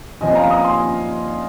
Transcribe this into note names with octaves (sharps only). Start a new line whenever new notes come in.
A#2 F3 C4 D#5 G#5
F5 A#5
A#5 D#6
G#5 C6